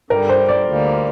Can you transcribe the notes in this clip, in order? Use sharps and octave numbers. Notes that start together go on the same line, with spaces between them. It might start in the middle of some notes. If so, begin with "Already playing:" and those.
G2 D3 G3 A#4
C5
D5
D2 D3 G3 A#3